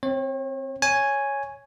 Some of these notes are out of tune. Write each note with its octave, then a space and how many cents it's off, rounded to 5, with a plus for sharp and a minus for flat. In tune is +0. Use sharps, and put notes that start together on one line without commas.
C4 +5 C#5 -40
C#5 +0 G#5 +0